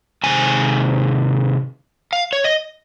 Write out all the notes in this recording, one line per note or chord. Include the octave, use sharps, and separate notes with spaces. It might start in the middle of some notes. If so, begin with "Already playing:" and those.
C3 D#3 G#3 C4 G#5
F5
C#5
D#5